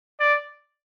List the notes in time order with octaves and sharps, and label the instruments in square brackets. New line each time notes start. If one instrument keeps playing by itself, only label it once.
[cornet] D5